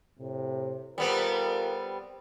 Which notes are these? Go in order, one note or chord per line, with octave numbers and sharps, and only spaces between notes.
A2 C3
G3 B3 C4 F4 A4 A#4